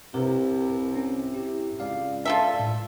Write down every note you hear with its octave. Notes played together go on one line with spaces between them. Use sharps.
C2 C3 A#4 B4
C#4
E4 G4
C#2 D5 F5
F4 A4 D5 E5 A5
A2